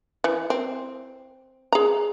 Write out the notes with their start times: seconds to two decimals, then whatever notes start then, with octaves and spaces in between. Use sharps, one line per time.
0.24 E3
0.50 C4
1.72 G#4 A#5